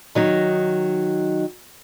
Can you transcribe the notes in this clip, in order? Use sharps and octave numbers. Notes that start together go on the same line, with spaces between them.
D#3 F#3 D#4